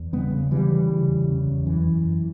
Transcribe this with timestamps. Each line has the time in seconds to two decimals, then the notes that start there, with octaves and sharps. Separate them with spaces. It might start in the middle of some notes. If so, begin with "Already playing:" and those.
Already playing: E2
0.13 C#3 G3 B3
0.32 C#3
0.51 C#3 E3 G3
0.71 C#3
0.90 C#3
1.08 E2
1.28 C#3
1.47 E2
1.66 F#2 E3
1.86 F#2
2.04 F#2